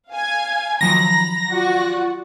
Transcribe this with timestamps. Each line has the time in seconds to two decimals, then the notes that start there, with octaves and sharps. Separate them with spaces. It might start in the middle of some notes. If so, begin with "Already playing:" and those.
0.11 F5 G#5
0.81 D#3 F3 F#3 A#5 B5 A#6
1.50 F4 F#4 D5 F#5